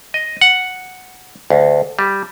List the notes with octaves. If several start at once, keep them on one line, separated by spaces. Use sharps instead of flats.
D#5
F#5
D2
G3